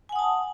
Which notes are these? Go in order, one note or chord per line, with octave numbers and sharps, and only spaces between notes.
F#5 G#5 A5 D#6